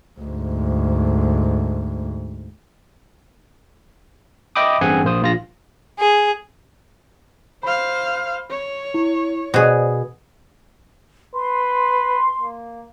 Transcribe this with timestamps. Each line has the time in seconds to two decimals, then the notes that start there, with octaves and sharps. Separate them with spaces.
0.20 D2 G#2
4.56 D#5 E5 G5 B5 D6 D#6
4.81 A1 G2 C4 G#4 F#5 G#5
5.04 A#1 A#3 C5 D#6
5.22 A#1 F4 A#6
5.99 G#4
7.63 C5 F5 B5
8.50 C#5
8.94 E4
9.54 B2 G#4 C5 D5
11.35 B4 C6
12.41 A#3